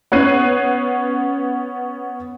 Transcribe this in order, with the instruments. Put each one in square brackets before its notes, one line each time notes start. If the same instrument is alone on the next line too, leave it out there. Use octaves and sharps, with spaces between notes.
[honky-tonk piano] B3 C#4 C#5 F#6 C7 D#7